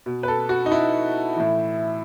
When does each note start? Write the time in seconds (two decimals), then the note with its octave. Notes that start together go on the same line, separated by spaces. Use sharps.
0.06 B2
0.23 B4
0.28 A4
0.49 F#4
0.66 D#4
0.72 E4
1.37 A2 E3